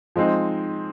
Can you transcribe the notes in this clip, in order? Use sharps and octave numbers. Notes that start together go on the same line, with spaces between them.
F3 G#3 C4 D#4